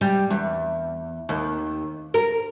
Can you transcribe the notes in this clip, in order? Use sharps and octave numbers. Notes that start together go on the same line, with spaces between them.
G3
E2
D#2
A#4